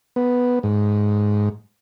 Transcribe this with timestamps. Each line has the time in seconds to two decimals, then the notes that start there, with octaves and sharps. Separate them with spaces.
0.16 B3
0.63 G#2